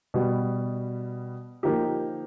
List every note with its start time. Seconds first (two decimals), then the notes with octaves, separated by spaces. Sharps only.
0.14 B2 G3 B3
1.63 F3 A#3 D#4 G4